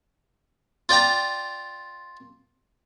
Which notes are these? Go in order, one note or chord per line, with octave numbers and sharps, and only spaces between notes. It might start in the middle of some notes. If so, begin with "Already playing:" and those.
F4 D5 G5 A#5